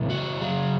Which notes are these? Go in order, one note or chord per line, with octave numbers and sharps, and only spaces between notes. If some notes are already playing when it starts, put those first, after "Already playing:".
Already playing: C#3 E3 G#3 C4
F#4
F#2 C#3 F#3 G#4